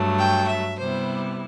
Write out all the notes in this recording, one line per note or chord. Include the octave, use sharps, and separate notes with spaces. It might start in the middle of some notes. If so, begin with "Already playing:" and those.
Already playing: G2 F#3 A3
G5
E5
C3 G3 B3 E4 C5